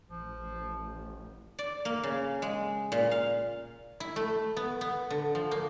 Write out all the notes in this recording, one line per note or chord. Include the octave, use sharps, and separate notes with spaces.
A1 F3
D5
A#3
C#3
G#3
A#2
F5
E4
A3
B3
B3
D3
F3
A#3